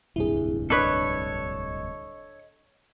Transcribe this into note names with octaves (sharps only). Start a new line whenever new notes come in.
D1 C2 G2 E4 G#4
D4 A4 B4 C#5 D#5